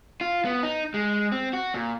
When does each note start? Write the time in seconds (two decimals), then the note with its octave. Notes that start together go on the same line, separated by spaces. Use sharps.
0.21 F4
0.45 B3
0.63 D#4
0.94 G#3
1.32 C4
1.53 F#4
1.75 A#2